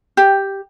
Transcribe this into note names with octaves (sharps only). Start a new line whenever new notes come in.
G4